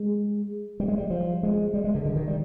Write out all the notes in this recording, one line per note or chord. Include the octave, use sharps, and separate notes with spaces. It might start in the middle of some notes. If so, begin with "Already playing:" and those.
Already playing: G#3
G3
G#3
G3
F3
G#3
G3
G#3
D3
D3
D#3
G3